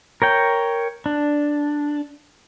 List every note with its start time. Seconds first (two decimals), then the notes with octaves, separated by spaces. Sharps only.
0.22 A#4 C#5 G5
1.06 D4